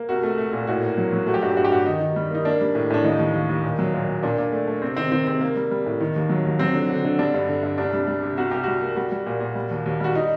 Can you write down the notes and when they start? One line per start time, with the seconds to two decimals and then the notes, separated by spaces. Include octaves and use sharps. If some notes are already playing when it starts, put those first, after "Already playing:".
Already playing: A#3
0.09 C2 F#4
0.23 A3
0.38 A3
0.53 A#2
0.67 A2 F#4
0.83 A#3
0.98 F#3
1.13 F#3
1.27 A3 F#4
1.34 G4
1.41 G2 F#4
1.50 G4
1.56 G2 F#4
1.64 G4
1.72 G2 F#4
1.86 D#3 D#4
2.00 D#3
2.16 G3
2.31 A#3 D#4
2.45 A#3 D4
2.61 G3
2.75 A2
2.90 A2 D4
3.04 D#2 D#4
3.19 D#2
3.34 D#2
3.49 D#2
3.64 A#2
3.79 F#3
3.94 A#2
4.08 A#2
4.23 A#2 D4
4.38 A#2
4.52 A3
4.68 A3
4.82 C3 C4
4.97 D#3 C4
5.12 D#3 C4
5.27 C3 C4
5.41 A#3
5.56 G3
5.71 G3
5.86 A2
6.01 D#3
6.16 D#2
6.30 F#3
6.45 D#2
6.59 F#3 C4
6.74 D3
6.90 D3
7.05 D3
7.18 G3 D4
7.34 G2
7.49 D3
7.63 G2
7.78 C2 D4
7.93 G3
8.07 G3
8.23 C3
8.37 C2 F#4
8.51 C2 G4
8.63 G3 F#4
8.82 A#3
8.96 G3 F#4
9.12 G3
9.26 A#2
9.40 A#2
9.55 G3
9.71 D#2
9.86 D#2
10.00 G3 F#4
10.15 D#4